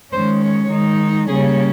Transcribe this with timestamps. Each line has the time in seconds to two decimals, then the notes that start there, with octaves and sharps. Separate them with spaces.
0.11 D#3 G#3 C#4 C5
0.41 C#5
0.69 D#3 G#3 D#4
1.27 C#3 G3 A#3 C#4 G#4